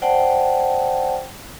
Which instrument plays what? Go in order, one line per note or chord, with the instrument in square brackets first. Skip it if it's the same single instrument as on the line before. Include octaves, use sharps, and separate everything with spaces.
[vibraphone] C5 D5 F#5 G5 A5